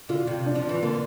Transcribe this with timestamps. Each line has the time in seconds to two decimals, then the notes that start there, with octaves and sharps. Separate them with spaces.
0.09 D3 F4
0.27 C3
0.46 D4
0.55 F3
0.69 E3
0.82 D3 A#3